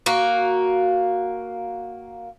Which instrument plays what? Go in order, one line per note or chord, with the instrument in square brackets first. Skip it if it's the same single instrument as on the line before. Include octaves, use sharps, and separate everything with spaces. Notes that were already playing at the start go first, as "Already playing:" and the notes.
[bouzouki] A#3 F#4